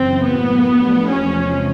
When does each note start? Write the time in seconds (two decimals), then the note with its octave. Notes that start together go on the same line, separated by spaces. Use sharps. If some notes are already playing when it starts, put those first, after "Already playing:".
Already playing: F#2 C#3 E3 C4
0.24 A2 F#3 A#3 B3
0.67 F3 A3 D4 G4
1.10 E2 C3 F3 G#3 C#4